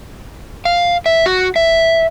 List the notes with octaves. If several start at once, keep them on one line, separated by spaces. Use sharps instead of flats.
F5
E5
F#4
E5